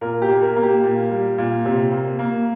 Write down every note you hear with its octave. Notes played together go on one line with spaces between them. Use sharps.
A#2 A#4
G4
A#3
A#4
A#3
G4
A#2
G3
A#2
C3
A#3
A#3